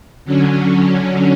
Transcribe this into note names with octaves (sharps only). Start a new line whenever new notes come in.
D3 F#3 C#4